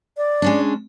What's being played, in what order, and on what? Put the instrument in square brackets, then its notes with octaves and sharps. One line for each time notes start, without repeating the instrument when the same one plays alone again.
[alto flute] D5
[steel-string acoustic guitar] G#3 C#4 D4